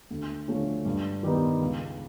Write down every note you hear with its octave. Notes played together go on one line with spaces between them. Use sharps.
D2
D3 F3 A3 C#4
G2
D#3 G3 B3 D#4
C#2